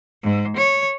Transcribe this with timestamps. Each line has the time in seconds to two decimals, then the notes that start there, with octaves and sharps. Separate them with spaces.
0.23 G#2
0.56 C#5